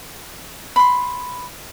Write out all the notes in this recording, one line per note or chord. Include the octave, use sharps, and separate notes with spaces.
B5 C6